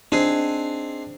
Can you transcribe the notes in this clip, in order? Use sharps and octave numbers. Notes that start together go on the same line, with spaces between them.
C4 D4 D#4 G#4